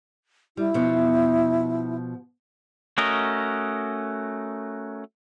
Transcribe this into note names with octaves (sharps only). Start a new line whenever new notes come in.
G3 E4
B2 F3 B3
A3 C#4 F#4 A#4 D#5